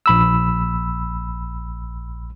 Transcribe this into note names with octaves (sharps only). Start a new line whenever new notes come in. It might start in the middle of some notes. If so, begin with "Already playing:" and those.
A#1 B5 E6